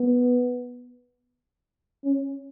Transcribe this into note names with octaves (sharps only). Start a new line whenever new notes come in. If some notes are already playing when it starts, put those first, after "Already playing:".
Already playing: B3
C#4